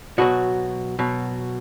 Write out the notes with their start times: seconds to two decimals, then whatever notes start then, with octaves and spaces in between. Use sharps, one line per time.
0.18 B2 F#3 F#4
0.99 B2 F#3